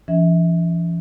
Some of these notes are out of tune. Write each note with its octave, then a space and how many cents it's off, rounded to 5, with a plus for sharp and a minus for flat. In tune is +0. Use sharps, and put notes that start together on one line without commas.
E3 +45 C#4 +35 E5 -35